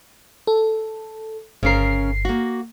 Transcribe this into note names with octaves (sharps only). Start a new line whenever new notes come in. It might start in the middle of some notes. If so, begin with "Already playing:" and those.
A4
G1 C#3 C#4 A#4 C7
A#3 F#4